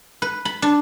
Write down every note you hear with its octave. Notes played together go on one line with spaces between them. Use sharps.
B4
B5
D4